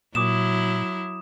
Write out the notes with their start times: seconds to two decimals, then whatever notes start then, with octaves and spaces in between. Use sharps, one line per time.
0.15 A#2 F#3 E4 D6 D#6 E7